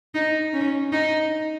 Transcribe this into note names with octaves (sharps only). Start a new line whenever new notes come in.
D#4
C#4
D#4